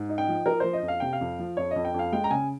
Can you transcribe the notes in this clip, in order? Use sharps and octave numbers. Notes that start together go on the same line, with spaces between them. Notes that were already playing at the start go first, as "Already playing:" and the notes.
Already playing: G#2
D#4
G5
F3
F3 A#4
F3 C5
D#5
F2
F5
C3 G5
F5
F2
F3
F2 C#5
F2 D#5
G5
F2 F5
G#3 G5
A#5
C#3 G#5